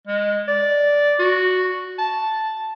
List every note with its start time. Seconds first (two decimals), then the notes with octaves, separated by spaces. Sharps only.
0.07 G#3
0.48 D5
1.19 F#4
1.99 A5